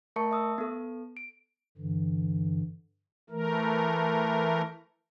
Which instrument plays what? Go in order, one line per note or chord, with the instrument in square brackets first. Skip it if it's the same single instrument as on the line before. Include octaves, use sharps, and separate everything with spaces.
[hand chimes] A3 A#4 E5 A5 C#6 C#7
E5 D#6 E6
B3 A4
D7
[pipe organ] G2 D3 E3
E3 A3 A#4